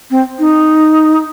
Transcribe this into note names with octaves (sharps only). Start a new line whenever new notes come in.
C4
D#4